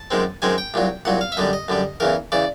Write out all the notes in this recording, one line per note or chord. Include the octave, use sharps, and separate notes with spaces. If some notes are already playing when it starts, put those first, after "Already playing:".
Already playing: A5
F#2 D#3 G#3 C4
F#2 D#3 G#3 C4 G#5
G5
C2 A#2 F#3
C2 A#2 F#3 F#5
F5
E5
F#2 D3 G3 D#5
D#5
F#2 D3 G3
E2 C#3 E3 A#4
C#3 E3 D5